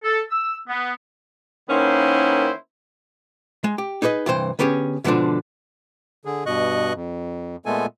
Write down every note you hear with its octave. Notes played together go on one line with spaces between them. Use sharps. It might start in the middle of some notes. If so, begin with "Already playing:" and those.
A4
E6
B3
D#3 A#3 B3 C#4 E4 C5
G#3
G4
D#4 G#4 B4 C#5 D#5
C2 G2 E3 C5 G5
D3 B3 C#4 G4 G#4
G#2 B2 D3 F3 C4 D4
D3 G#4
G2 B2 D#5 C#6 F#6
F2
A#2 G#3 A3 B3 A4 G#5